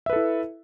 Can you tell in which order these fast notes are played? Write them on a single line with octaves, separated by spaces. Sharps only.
E5 B4 A4 E4